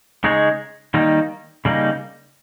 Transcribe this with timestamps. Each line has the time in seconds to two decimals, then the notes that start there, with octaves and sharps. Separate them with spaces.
0.24 C#3 G#3 D#4 G#4 C#5
0.94 D#3 G3 A#3 D#4
1.65 C#3 G3 A#3 D#4